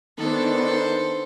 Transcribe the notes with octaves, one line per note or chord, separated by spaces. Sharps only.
D#3 B3 D4 A4 C5